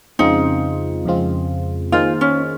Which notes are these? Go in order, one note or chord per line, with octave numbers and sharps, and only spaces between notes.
F2 C#3 G#3 C4 D#4 F4
F2 C#3 G#3 C4 F4
D#3 A#3 D#4 F4 G#4 C5
C#4